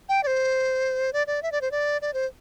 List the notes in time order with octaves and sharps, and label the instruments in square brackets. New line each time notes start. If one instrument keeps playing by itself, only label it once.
[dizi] G5
D5
C5
D5
D5
E5
D5
C5
D5
D5
C5